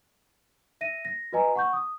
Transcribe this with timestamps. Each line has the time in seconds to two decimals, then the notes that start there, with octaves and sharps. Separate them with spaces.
0.81 E5 A#6 D#7
1.05 A#6
1.33 F#4 B4 D#5 G#5 A#5
1.55 F#5 C#6 G6
1.73 D#6